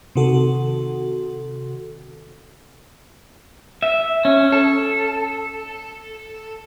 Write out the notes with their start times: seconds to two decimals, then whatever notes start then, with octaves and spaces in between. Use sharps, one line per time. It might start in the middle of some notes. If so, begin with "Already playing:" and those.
0.16 C3 D#3 F#4 A4
3.82 E5
4.25 C#4
4.52 A4